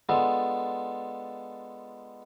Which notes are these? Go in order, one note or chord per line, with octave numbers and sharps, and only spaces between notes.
G#3 B3 D4 F4 A4